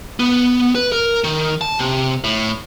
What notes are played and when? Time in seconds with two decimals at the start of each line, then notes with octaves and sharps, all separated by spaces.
0.20 B3
0.75 B4
0.92 A#4
1.24 D#3
1.61 A5
1.79 C3
2.24 A2